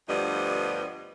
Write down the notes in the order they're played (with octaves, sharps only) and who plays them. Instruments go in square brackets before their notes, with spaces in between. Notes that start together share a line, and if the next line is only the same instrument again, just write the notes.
[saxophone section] D2 G2 F3 G3 B3 D#5